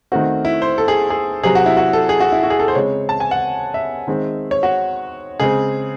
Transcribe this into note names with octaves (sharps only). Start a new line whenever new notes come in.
D#3 A3 C4 F#4
E4
C5
A4
G#4
G#4
C3 F#3 C4 G#4
F#4
E4
F#4
A4
G#4
F#4
E4
F#4
G#4
A4
C5
C#3 G#3 C4 C#5
A5
G#5
F#5
E5
D#3 G#3 C4
C#5
F#4
C#3 G#3 C4 G#4